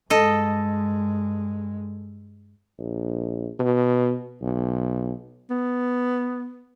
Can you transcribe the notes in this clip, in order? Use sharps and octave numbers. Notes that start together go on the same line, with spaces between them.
G2 G#3 A4 D#5
A#1
B2
B1
B3